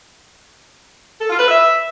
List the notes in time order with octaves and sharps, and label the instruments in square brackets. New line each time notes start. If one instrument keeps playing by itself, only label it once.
[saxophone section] A4
F4
B4
E5